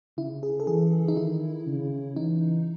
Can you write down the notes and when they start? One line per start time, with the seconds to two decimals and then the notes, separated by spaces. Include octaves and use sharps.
0.17 C#3 E4
0.43 G#4
0.60 A4
0.67 E3 G#4
1.08 D#4
1.17 D#3 E4
1.67 C#3
2.16 E3 D#4